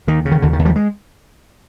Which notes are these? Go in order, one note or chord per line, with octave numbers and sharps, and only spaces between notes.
D#2 D#3
C#3
D#3
D#2 D3
D#3
D#2
F3 G3
G#3